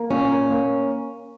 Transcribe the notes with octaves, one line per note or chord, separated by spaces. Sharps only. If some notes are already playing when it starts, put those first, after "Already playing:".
Already playing: A#3
A#2 C#4
A#3
A#3